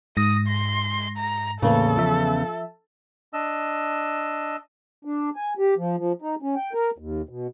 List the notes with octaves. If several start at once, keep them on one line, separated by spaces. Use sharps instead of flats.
G#2 D#6 A#6
C6
A#5
E2 A2 C#3 A#3 A4
F3 E5
D4 D#5 E6
D4
G#5
G4
F3
F3
D#4
C#4
G5
A#4
D#2
B2